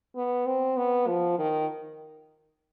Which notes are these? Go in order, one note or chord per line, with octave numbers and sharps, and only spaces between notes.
B3
C4
B3
F3
D#3